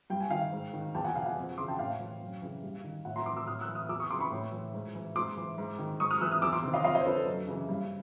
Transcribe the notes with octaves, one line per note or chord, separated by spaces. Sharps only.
G2 G5
G#5
D#3 F5 G5
G#2
D#3
E2 G5 A5
F#5 G#5
B2 F5 G5
F#5 G#5
F2
C#3 E3 C6 D6
G5 A5
F#5
A2 F5 G5
E3
F#2
C#3 E3
G2
D#3
A2 E5 F#5
A#5 C6
E3 C6 D6
D6 E6
A2 D#6 F6
E6 F#6
E3
D#6 F6
E2 D6 E6
C#6 D#6
C#3 E3 C6 D6
B5 C#6
A2
E3
G#2
E3
G#2 C6 D6
E3
G#2
D#3
G#2 C#6 D#6
D#6 F6
E3 E6 F#6
D#6 F6
E2 D6 E6
C6 D6
C3 D#3
D#5 F5
F2 D#5 F5
C#5 D#5
C5
D3 A4 B4
A4
F#2
C#3 E3
G2